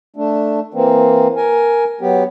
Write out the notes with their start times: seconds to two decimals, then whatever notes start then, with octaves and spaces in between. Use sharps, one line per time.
0.16 A3 D4
0.74 E3 A#3 C4
1.36 A#4 G#5
2.01 F#3 B3 G4